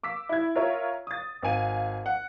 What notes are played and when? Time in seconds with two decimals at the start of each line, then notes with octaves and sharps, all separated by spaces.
0.03 D6 E6 B6
0.29 E4 G#6
0.55 F4 A#4 C#5 E5
1.07 D#6 A6
1.43 G#1 F5 G#5 D#7
2.06 F#5